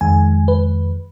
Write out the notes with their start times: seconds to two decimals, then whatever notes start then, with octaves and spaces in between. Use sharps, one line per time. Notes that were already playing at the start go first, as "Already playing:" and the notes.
0.01 F2 D#3 G#3 G#5
0.48 B4